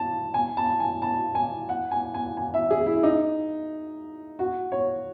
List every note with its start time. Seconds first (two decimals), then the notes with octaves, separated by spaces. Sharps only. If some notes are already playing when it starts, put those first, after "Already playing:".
Already playing: A5
0.34 G#5
0.57 A5
0.80 G#5
1.02 A5
1.35 G#5
1.69 F#5
1.91 G#5
2.14 G#5
2.37 G#5
2.54 E5
2.71 G#4
2.86 E4
3.03 D#4
4.39 F#4
4.72 C#5